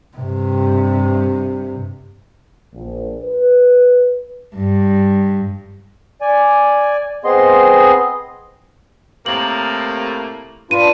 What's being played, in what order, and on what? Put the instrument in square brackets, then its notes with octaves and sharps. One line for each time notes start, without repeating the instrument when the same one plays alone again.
[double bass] G2 C3
[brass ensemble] A#1
B4
[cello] G2
[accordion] D5 G#5
B3 C4 G#4 D#5 C6
[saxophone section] A2 C3 A#3 [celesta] F#7
[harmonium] D4 F4 B4 [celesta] D#7